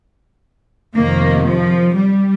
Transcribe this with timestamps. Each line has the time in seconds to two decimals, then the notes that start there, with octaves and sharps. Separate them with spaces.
0.94 F2 C3 D#3 A#3
1.45 F3
1.95 G3